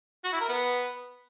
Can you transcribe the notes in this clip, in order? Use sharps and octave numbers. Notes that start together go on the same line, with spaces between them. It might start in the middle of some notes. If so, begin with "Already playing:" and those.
F#4
E4
A#4
B3